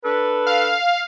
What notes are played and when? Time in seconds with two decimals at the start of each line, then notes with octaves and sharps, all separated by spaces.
0.05 D4 A4 B4
0.47 F5